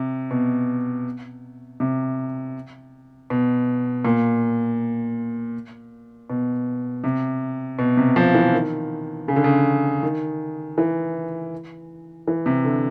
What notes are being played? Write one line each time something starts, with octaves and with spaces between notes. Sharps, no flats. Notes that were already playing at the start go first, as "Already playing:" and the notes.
Already playing: C3
B2
C3
B2
A#2
B2
C3
B2
C3
F3
E3
D#3
C#3
D3
C#3
D#3
E3
E3
C3
D3